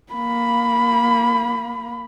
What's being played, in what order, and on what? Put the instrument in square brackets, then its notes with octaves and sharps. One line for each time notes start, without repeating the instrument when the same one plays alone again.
[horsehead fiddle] A#3 B5